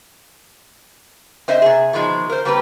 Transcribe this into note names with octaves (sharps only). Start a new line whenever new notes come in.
C4 C5 D#5 E5
C3 G#4
B2 D#3 F3 G#3
A#4 C5
G3 A#3 C4 G4 B4